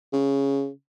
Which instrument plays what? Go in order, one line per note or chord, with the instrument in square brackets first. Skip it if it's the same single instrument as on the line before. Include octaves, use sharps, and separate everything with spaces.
[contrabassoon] C#3